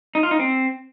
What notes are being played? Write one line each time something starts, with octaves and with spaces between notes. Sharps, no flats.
D#4
F4
D#4
C4